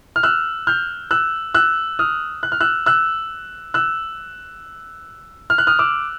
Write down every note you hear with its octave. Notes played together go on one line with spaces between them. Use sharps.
F6
E6 F#6
F6 G6
E6 F#6
E6 F#6
D#6 F6
F#6
F6
E6 F#6
E6 F#6
E6 F#6
F6
F#6
D#6 F6
D6 E6